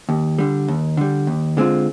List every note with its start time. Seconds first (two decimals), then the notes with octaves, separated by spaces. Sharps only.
0.09 D#2
0.38 D3 G3
0.68 D#2
0.97 D3 G3
1.27 D#2
1.57 D3 G#3 C4 F4